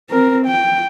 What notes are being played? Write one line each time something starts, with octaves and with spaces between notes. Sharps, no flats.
C4 A#4
G5